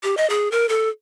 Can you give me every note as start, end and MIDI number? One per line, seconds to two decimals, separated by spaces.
0.03 0.17 67
0.17 0.28 75
0.30 0.51 68
0.51 0.68 70
0.69 0.89 69